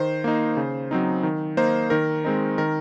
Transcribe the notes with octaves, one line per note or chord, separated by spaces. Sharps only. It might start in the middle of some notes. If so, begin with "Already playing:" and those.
Already playing: D#3 C5
A#3 D#4
C#3
F#3 C4 D#4
D#3
A#3 D#4 C5
D#3 A#4
G#3 C4 D#4
D#3 A#4